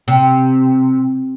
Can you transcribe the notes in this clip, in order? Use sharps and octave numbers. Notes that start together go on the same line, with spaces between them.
C3